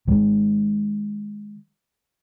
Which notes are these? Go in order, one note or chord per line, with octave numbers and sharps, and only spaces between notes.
D#3 G#3